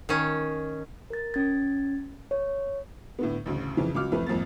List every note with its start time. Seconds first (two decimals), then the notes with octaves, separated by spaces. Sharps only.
0.09 D#3 C#4
1.10 A#4 A6
1.34 C#4 G#6 A6
2.31 C#5
3.19 A2 D3 B3
3.46 A1 D2 C#3
3.77 F2 C#3 E3
3.95 C#2 F#3 D6 F6
4.12 F2 E3 A3 B4
4.27 G#1 F2 A#3 A6